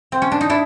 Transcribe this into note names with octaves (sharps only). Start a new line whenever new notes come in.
C4
C#4
D4
D#4
D4 E4